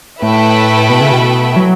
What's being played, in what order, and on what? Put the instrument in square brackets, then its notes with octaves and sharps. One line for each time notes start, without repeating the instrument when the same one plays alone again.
[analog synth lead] A2 [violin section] A3 E4 B4 E5 G5
[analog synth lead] B2
C#3
B2
F#3